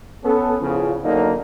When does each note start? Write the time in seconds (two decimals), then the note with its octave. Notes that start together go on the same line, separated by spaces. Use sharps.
0.24 B3 C#4 A4
0.61 E2 C#3 F3
1.03 D3 F#3 A#3 B3 D4 D#4